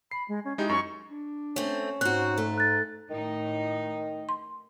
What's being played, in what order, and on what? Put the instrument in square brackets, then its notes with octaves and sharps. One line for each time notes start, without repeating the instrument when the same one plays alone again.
[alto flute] B5 [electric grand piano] C7
[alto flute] G#3
C#4
[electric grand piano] G#3 D#4 E4 [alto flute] G4
[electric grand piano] F#2 [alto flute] C#4 [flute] C#6
[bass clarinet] D4
[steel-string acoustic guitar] A3 C4 [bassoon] C#4
[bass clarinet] G#2 [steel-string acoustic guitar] C4 F#4 [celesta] F#6
[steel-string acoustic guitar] A3
[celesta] F#6 A6
[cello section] A2 D#4 [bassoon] D#3
[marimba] C6